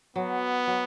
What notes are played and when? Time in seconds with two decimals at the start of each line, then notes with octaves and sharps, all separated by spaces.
0.16 F#3 B3
0.67 F#3